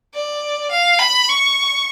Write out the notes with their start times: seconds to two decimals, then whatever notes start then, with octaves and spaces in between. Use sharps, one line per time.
0.14 D5
0.71 F5
0.99 B5
1.29 C#6